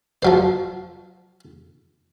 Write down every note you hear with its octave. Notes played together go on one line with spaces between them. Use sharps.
F3 F#3 C5